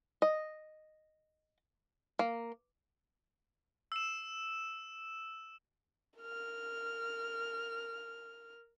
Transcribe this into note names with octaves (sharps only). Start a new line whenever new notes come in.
D#5
A#3
E6 E7
A#4 F6